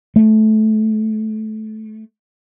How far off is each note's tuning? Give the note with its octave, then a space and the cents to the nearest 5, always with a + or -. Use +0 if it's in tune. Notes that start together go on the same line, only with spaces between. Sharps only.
A3 -20